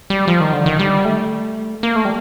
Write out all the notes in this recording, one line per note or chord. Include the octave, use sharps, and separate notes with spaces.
G3
F3
D#3
D3
D#3
G3
A3
A#3
A3
G3